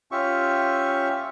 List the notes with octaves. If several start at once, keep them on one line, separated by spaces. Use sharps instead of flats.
C#4 F4 G4 E5 C#6